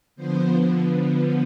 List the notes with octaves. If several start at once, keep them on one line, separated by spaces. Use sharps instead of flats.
D3 F3 B3 C5